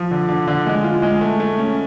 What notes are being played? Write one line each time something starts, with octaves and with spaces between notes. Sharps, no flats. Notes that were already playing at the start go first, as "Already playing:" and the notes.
Already playing: F3
D3
D3
D3
G#3
F4
G#3
A3
A3
C#4